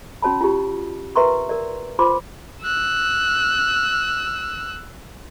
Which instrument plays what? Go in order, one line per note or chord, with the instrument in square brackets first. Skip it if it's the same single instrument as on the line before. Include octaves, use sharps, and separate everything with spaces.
[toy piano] C#4 F#4 C#5 A5 B5
F4 G4
A#4 B4 E5 A#5 C6 C#6
A#4 D5
F4 C5 B5 C6 D6
[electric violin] E6 F#6